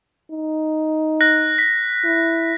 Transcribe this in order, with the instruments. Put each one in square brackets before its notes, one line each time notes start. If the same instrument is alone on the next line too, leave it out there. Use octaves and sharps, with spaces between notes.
[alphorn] D#4
[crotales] F#6 A#6
B6
[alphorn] E4